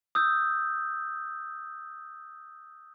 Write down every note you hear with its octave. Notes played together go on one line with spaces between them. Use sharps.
D#6 E6 G6